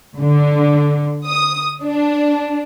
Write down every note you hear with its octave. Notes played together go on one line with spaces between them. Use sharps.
D3
D#6
D4